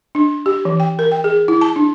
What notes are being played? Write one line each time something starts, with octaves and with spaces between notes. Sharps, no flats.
D4
G4
E3
G5
A#4
G5
G#4
E4
A5
D4